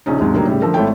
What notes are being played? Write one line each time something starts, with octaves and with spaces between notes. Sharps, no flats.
A#1 C#3 C#4 D#4
D#2 G#2 C3 F#3
D3 F#3 G3 A#3 D#4
A2 C#3 G3
D3 F3 A3 A4 A#4
G#1 A3 E4 C#5 G5